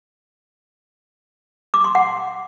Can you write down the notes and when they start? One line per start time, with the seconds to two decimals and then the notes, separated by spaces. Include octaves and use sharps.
1.74 D6
1.84 C6
1.95 F#5